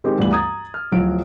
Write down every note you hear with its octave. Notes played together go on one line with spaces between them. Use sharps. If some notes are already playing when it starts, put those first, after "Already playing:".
D#3 G#3 C4 D#4 G4
D2 G2 E3 G3 B3 F#7
A#5 D#6 G#6 A6
F6
D1 F3 F#3 D7